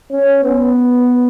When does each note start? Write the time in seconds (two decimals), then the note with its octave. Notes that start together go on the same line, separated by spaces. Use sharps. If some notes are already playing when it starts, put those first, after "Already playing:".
0.12 C#4
0.44 B3